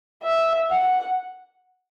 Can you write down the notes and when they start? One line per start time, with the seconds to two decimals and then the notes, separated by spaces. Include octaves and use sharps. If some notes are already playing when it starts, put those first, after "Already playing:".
0.23 E5
0.70 F#5